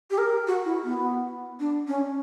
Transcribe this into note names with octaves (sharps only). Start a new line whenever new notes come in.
G4
A#4
F#4
E4
B3
D4
C#4